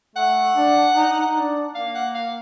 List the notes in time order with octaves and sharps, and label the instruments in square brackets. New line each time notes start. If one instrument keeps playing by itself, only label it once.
[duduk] A3 [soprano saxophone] F#5
[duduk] D4
D#4
D4
[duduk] A#3 [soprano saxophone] F5
[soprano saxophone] F#5
F5